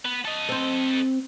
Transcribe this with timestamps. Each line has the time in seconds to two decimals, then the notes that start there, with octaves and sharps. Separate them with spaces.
0.05 B3
0.25 A4 D#5
0.49 C4 C5